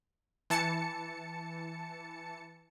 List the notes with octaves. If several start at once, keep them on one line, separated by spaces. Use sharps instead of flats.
E3 A5 C#7